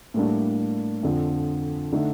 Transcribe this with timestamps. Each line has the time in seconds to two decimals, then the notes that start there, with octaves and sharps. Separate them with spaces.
0.14 A2 G3 A#3 D4
1.03 F2 D3 F3
1.92 D3 A3 D#4